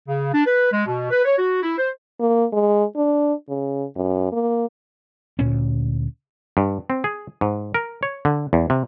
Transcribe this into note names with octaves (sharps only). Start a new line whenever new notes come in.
C#3
D4
B4
G#3
B2
B4
C#5
F#4
E4
C5
A#3
G#3
D4
C#3
F#2
A#3
D2 A#2 B3 C#4
G2
C4
G#4
G#2
A#4
C#5
D3
E2
C3